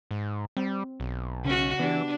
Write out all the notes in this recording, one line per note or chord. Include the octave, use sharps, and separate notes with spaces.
G#2
G3 C4
B1
C#3 C#4 F#4
E3 B3 D4 G4